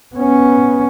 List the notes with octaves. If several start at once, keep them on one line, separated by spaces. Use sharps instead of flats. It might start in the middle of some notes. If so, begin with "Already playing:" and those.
B3 C#4